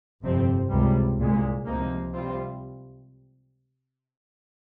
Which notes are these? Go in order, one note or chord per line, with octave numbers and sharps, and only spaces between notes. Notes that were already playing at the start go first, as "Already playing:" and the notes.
G1 F2 C3 F3 C4
C#2 C3 G3
C2 A#2 G#3
C#2 C3 F3 A#3 D#4
C3 G3 C4 F4